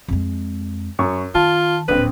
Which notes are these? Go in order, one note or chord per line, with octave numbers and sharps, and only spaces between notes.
F2 G#3
F#2 C#6
D#3 F4 A5
D1 A#1 C4 B4